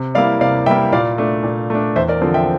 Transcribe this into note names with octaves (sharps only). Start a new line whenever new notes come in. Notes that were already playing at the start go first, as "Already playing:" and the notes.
Already playing: C3
G3 A#3 E4 D5 F5
C3 D5 F5
G3 A#3 E4 E5 G5
A#2 D5 F5
A3 D4
A#2
A3 D4
E2 C5 E5
A#4 D5
D3 F3 C4 A4 C5
E5 G5